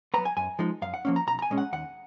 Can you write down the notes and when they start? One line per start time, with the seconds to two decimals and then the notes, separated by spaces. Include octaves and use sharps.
0.14 F#3 B3 A#5
0.25 G#5
0.37 F#2 G#5
0.59 F3 G#3 D#4
0.82 F#2 F5
0.94 F#5
1.05 F3 A#3 C#4
1.16 A#5
1.27 B1 A#5
1.39 A#5
1.42 G#5
1.50 A#2 G#3 C#4
1.58 F#5
1.73 D#2 F#5